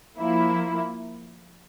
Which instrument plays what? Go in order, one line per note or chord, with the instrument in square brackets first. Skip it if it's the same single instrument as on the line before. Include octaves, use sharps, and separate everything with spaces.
[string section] F3 A#3 E4